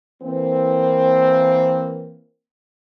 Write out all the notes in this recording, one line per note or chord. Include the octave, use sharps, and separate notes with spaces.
E3 A#3 C4